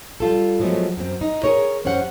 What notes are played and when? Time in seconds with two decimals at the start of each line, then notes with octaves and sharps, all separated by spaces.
0.20 G3 F4 A4
0.60 F3 F#3 G#3 A3 B3
0.97 F#2 C4
1.21 D#4
1.44 G#4 A#4 C#5
1.84 F#2 C#4 G4 C5 F#5